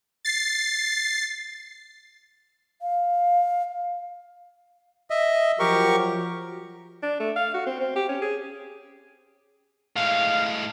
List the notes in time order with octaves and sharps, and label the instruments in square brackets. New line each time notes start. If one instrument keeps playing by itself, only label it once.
[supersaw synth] A6 C7
[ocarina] F5
[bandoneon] D#5 E5
[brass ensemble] F3 F#3 [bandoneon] G4 A#4 C#6
[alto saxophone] D4
A3
F5
F#4
C4
C4
G4
C#4
G#4
[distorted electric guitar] A2 G#3 [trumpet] F5